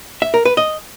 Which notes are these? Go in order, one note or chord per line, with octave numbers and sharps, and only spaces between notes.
E5
A#4
B4
D#5